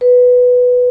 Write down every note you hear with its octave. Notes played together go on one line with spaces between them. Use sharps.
B4